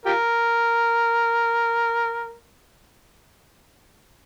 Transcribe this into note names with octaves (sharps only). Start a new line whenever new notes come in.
F4 G4 A#4